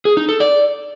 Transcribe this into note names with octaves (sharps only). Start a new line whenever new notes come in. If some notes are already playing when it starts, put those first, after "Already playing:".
G#4
D#4
A4
D5